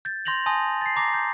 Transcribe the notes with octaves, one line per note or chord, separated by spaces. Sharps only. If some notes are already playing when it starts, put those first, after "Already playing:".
G6 A6
C6 G6 A#6 F7 F#7
G#5 A5 C6 D#6 A#6
A6 C7
A#5 D6 A#6 C7
G6